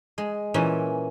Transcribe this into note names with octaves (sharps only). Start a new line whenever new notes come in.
G#3
A#2 E3 C#4